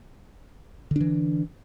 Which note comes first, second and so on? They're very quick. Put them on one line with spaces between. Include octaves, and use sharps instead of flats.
D3 D4 E3